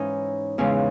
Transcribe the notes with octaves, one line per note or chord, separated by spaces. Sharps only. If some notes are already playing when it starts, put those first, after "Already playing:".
Already playing: G#2 E3 G#3 C#4 D#4
E2 C#3 E3 G#3 C#4